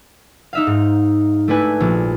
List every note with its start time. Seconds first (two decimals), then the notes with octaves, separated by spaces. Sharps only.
0.53 D#4 E5 F5
0.67 G#2
1.48 A3 D4 E4 B4 G#5
1.80 A#1